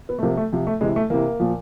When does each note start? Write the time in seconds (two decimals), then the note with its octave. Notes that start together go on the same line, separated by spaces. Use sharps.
0.09 B3
0.19 A3
0.23 C3 F3 A#3
0.37 A3
0.52 C3 F3
0.67 A3
0.81 C3 E3 G#3
0.96 A3
1.10 C3 E3 A#3
1.40 A#2 F3